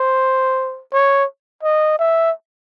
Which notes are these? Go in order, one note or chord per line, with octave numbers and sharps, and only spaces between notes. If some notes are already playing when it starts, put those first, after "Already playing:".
Already playing: C5
C#5
D#5
E5